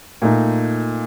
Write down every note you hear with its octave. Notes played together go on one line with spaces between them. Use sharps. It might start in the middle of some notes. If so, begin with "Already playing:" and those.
A#2 A3 D#4